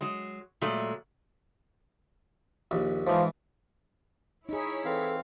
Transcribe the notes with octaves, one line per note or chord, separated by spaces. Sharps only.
F#3 G#3
A#2 F#3 G#3 A3
A#1 D#2
G#2 E3 F3
D#4 E4 G#4 C#5 B6
E3 C4 A4 F5